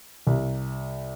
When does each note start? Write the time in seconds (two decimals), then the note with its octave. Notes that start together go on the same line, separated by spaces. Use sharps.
0.27 C2